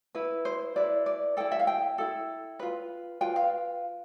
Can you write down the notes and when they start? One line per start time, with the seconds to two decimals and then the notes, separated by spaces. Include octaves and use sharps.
0.15 E4 B4
0.45 C5
0.76 E4 B4 D5
1.06 D5
1.37 E4 A4 G5
1.52 E5
1.59 F5
1.67 G5
1.98 E4 A4
2.59 F4 B4
3.21 F4 B4 G5
3.36 F5